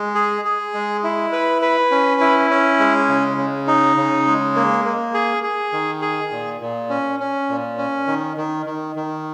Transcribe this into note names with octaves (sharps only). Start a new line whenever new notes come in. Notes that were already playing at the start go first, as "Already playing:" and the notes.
Already playing: G#3
G#4
G#4
G#3
E4
B4
B4
C#4
E4
C#4
G#3
C#3
C#3
D#4
C#3
G#3
A#3
A#3
G#4
G#4
D#3
G#4
A#2
A#2
C#4
C#4
A#2
C#4
D#3
D#3
D#3
D#3